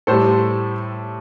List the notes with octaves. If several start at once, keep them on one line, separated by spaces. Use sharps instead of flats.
A2 G3 A4 C5